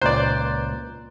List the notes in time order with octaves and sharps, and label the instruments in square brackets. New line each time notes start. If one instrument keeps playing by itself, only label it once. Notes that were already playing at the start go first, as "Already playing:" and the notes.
[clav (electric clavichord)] C#2 A#2 [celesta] B4 A#5 F#6 [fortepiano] C5 D5